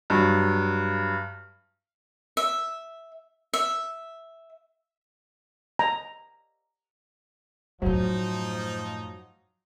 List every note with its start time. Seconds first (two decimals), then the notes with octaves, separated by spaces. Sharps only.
0.10 G2 F#3
2.37 E5
3.53 E5
5.79 A#5
7.82 F#2 A2 F3 F#3 D#4